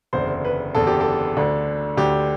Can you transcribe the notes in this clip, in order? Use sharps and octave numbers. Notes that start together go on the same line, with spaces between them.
F#1 E2 D3 C5
B4
F#1 E2 D3 A4
G4
A4
D2 D3
D2 D3 G4